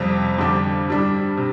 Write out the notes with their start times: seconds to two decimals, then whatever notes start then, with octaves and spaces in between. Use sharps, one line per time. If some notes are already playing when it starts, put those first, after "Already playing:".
Already playing: F2 C3 G3
0.38 F2 D3 G3 D4 G4
0.88 G2 G3 D4
1.37 C3